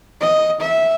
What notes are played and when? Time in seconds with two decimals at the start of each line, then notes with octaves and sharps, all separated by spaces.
0.21 D#5
0.60 E5